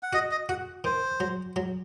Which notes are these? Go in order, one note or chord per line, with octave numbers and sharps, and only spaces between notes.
F#5
F#4 D#5
D#5
F#4 F#5
D#3 C5
F#3
F#3